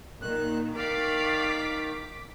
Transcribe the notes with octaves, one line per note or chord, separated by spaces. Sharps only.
A#2 D#3 F#6
D#3 D5 F5 D6 B6